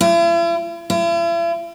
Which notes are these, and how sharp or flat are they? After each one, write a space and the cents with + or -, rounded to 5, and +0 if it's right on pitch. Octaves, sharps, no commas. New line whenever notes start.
E4 +45
E4 +45